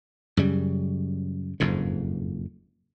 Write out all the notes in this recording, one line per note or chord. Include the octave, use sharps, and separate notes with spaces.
F#2 C#3 G3
F#1 F2 G#2